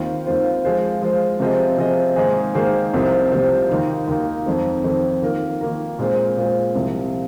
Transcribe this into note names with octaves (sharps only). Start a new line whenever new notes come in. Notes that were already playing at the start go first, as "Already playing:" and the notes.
Already playing: D#2 D#3 C4 F4 C5
D#2 D#3 C4 F4 C5
F3 G#3 F4 C5
F3 G#3 F4 C5
C3 F3 C4 G#4 D#5
C3 F3 C4 G#4 D#5
G#2 D#3 A#3 G#4 C5
G#2 D#3 A#3 G#4 C5
C2 C3 F3 C4 F4
C2 C3 F3 C4 F4
D#2 D#3 A#3 D#4
D#2 D#3 A#3 D#4
F2 D#3 C4
F2 D#3 C4
D#3 A#3 F4 A#4
D#3 A#3 F4 A#4
A#2 G#3 C4 F4 C5
A#2 G#3 C4 F4 C5
C2 C3 F3